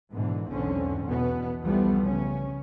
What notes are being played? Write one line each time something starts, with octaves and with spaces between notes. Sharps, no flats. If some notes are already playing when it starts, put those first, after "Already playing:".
G#2 B2 D3 E3
B1 E2 G#2 D3 C4 C#4
E2 B2 B3
C2 E3 F3 G3 A3 B3
C#3 C#4